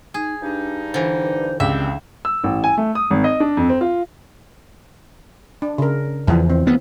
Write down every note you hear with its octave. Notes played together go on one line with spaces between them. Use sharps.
D#4 G#4
G2 D4 D#4
D3 E3 C5
C#2 G3 C4 D4 E5
E6
A1
G#5
A3
D#6
G#1
D#5
D4
F2
C4
F4
D4
C#3 A#4
E2 E3 F3
C4
D2 B3